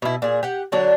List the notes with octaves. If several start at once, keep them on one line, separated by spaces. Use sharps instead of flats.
B2 E4
A#2 G#4
G4 F#5
D3 F#3 D4